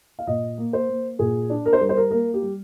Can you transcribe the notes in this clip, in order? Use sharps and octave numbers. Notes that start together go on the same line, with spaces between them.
F5
A#2 D#5
A#3
C5
A#3
A#2 G#4
D4
A#4
C5
G3 A#4
C5
A#4
A#3 A#4
G4
G3